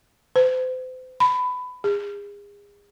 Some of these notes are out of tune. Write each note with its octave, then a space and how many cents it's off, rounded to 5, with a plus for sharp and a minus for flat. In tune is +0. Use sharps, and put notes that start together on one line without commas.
C5 -35
B5 +20
G#4 -35